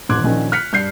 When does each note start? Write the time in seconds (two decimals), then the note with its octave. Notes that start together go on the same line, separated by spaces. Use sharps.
0.09 D#1 A1 C6 D6 F#6 G#6
0.24 A#1 D#3 C#4
0.52 F6 F#6 B6 C#7
0.73 G2 G6 C7